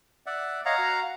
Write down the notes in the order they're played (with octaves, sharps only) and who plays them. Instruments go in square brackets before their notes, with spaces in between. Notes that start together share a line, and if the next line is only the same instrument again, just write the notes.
[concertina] D5 E5 F#5
[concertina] C#5 D#5 [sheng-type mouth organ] F5 F#5 A#5
[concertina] F#4